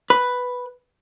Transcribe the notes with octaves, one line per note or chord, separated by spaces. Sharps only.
B4